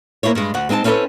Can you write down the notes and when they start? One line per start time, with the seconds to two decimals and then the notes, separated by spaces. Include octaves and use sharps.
0.23 A#3 C4 E4 C5 C#5
0.35 G2 G#3
0.54 D2 F#5
0.69 G#3 C4 D#4 G#5 A5
0.84 C4 C#4 E4 G4 A4 B4